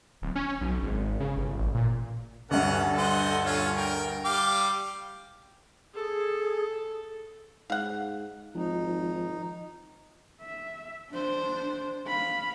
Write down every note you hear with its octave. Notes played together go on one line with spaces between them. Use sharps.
D1
C#4
B1
G#1
C#3
G1
A1
A#2
D2 G2 C#4 A4 F#5
C5 D#5 F#5
C#4 F4 C#5
A#4 G5
G3 F5 G5 D6
G#4 A4
G#2 F5 F#5
G#1 F3 D#4
E5
D4 C5
F5 B5